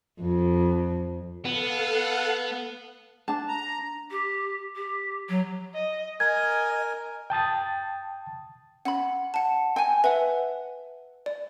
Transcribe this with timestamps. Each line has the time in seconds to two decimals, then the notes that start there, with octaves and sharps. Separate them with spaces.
0.21 F2
1.45 B3 A4 F5 F#5
3.28 D4 A5
3.48 A#5
4.11 G4
4.76 G4
5.29 F#3
5.74 D#5
6.20 A#4 D#5 G#5 G#6
7.30 G5 A5 D#6 A6
8.85 C#4 F#5 B5
9.34 F#5 A5
9.76 G5 G#5
10.04 B4 E5 F#5
11.26 D5